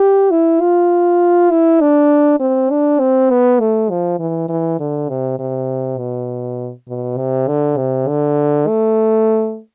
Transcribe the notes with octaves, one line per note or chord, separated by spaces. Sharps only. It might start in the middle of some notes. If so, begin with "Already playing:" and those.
Already playing: G4
E4
F4
E4
D4
C4
D4
C4
B3
A3
F3
E3
E3
D3
C3
C3
B2
B2
C3
D3
C3
D3
A3